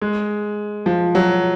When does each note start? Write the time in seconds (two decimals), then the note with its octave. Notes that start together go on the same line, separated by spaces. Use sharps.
0.02 G#3
0.86 F3
1.15 F#3